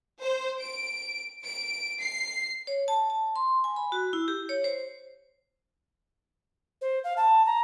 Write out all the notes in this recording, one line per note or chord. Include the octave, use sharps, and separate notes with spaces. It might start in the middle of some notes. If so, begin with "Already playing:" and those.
C5
D7
D7
C7
C#5
A5
A5
C6
G#5
B5
F#4
E4
G4
C#5
C5
C5
F5
A5
A#5